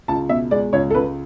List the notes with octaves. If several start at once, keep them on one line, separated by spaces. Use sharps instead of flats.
C#2 A5
B2 E5
G#3 D5
C#2 C#5
A4
C#2 B4